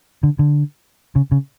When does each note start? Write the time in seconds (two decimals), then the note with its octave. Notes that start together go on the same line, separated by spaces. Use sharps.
0.23 D3
0.39 D3
1.16 C#3
1.32 C#3